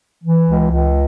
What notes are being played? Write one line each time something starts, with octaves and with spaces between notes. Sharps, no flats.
E3
C#2
C#2